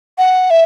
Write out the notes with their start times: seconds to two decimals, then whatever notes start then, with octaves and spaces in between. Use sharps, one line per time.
0.18 F#5
0.50 E5